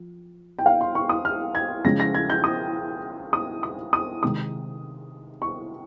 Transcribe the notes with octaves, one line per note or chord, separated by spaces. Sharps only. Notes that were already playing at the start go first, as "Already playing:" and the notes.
Already playing: F3
G5
F5
C6
C#6
D#6
F6
G#6
C#3 F3 G#3 C#4 F4 A#6
A#6
G#6
G6
D#6
D#6
D#6
D#6
C3 D#3 G#3 D#4 D#6
C#6